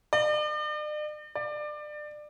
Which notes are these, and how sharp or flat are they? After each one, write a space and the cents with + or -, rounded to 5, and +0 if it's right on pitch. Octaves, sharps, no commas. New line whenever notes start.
D5 +45
D5 +25